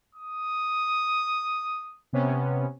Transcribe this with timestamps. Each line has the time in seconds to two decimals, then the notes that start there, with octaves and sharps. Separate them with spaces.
0.15 D#6
2.13 C3 B3 C#4